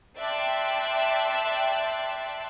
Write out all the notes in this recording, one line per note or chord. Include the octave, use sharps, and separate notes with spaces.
D5 E5 G5 A5 C6 F#6